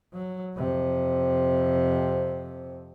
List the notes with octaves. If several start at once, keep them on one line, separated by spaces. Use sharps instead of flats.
F#3
F2 C3